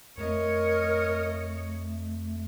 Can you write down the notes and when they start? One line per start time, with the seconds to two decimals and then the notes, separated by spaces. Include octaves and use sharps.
0.18 F2 A3 A#4 C#5 D#5